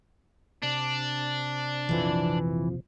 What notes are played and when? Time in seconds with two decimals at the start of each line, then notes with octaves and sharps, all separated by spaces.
0.63 C3 D4
1.89 A#1 F2 E3 F3